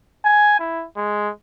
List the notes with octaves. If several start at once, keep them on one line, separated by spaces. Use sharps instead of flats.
G#5
E4
G#3